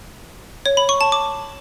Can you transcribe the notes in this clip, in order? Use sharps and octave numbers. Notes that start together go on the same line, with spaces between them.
C#5
B5
C#6
A5
D6